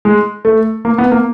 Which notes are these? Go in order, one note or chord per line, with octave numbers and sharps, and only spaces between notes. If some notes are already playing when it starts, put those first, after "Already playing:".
G#3
A3
A#3
B3
A#3